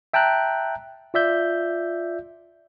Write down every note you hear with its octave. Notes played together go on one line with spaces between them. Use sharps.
E5 G5 A5 A#5 F#6
F4 D5 E5 G6